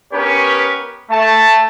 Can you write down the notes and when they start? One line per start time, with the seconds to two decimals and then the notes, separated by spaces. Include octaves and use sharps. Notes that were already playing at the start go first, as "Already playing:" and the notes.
0.13 B3 C#4 G4 A#4 B4 C#5
1.11 A3 A5